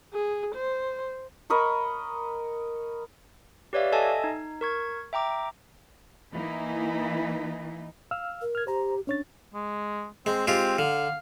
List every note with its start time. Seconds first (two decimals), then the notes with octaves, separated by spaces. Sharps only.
0.13 G#4
0.55 C5
1.50 A#4 D#5 B5 C#6
3.73 G4 B4 C#5 D5 E5 F5
3.92 A4 D#5 E5 G#5 A5
4.24 D#4
4.61 A#4 C#6 G#6
5.13 E5 G5 A#5 D6
6.33 E3 A#3 D#4 E4
8.11 F5 E6 F6
8.41 A#4
8.55 F6 G#6
8.67 G4 C5 A#5
9.07 C#4 D4 C#5 A6
9.54 G#3
10.26 G#3 C4
10.47 G#3 C4 F4 G4
10.79 D3 F5